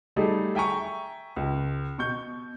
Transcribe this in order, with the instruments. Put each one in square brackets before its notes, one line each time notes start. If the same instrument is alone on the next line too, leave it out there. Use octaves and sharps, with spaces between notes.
[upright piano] F#3 G3 A3 D#4 G#4
E5 G5 G#5 A#5 C#6
C#2
B2 C#6 G6